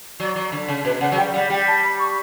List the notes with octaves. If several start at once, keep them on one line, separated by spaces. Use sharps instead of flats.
F#3 D5
F#3
D3
C#3
B2 B4
C#3 F#5
F#3
G3 G5
G3 F#5
G3 G5
A5
B5
C#6